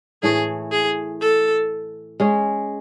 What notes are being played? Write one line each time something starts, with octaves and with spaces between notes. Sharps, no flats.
A2 E3 A3 G#4
G#4
A4
G#3 C#4 G#4